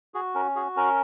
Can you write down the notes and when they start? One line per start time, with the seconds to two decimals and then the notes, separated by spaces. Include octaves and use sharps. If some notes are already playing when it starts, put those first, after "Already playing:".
0.14 F#4 G#4
0.35 C#4 A#4
0.56 F#4 G#4
0.76 C#4 A#4